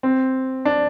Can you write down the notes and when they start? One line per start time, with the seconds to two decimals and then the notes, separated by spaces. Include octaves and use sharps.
0.03 C4
0.65 D4